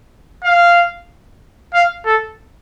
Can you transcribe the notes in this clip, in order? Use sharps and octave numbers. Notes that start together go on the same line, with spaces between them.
F5
F5
A4